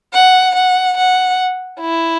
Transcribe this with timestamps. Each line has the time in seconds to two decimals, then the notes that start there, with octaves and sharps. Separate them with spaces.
0.14 F#5
0.55 F#5
0.98 F#5
1.81 E4